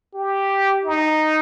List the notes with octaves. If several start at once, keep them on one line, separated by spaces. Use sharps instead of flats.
G4
D#4